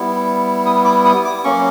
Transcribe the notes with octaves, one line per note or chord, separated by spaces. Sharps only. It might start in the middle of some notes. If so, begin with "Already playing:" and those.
Already playing: G3 B3 E4
D#6
D6
D#6
D6
F#3 A#3 C#4 C#6